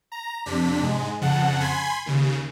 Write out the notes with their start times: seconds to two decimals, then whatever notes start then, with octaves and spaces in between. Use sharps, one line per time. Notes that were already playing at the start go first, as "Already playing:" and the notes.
0.12 A#5
0.45 F2 C3 D4 B6
0.81 G#2 G#3
1.21 F2 C#3 F#5 A5
1.60 G#5 B5 C6 G#6
2.06 D#2 C#3